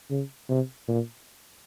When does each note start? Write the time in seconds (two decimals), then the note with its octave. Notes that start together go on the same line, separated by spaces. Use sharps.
0.10 C#3
0.49 C3
0.88 A#2